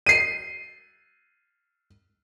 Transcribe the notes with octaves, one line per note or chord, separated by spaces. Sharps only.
C7 D#7